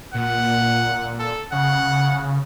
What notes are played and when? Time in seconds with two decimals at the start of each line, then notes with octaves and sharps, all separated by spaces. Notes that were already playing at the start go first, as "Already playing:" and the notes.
0.14 A#2 F#5
1.19 A4
1.52 C#3 F#5